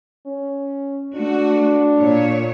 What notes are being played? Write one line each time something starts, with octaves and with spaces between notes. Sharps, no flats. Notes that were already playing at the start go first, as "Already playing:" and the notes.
C#4
A3 D4 F#4
A#2 C#5